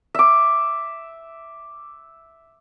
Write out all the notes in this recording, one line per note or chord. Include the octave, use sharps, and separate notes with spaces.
E5 D6